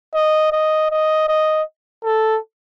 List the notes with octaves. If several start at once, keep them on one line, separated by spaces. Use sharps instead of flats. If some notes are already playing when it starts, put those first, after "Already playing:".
D#5
D#5
D#5
D#5
A4